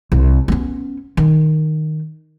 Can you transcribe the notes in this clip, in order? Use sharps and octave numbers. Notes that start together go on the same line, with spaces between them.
C2
B3 C#4
D#3